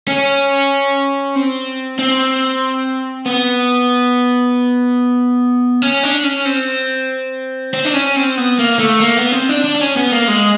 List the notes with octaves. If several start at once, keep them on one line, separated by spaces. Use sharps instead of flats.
C#4
C4
C4
B3
C#4
D4
C#4
C4
C4
D4
C#4
C4
B3
A#3
A3
A#3
B3
C4
D4
D4
D4
C#4
B3
A#3
G#3